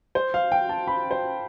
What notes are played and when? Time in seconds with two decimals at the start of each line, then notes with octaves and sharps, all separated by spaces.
0.15 C5
0.34 F5
0.52 G5
0.69 A5
0.87 B5
1.11 C5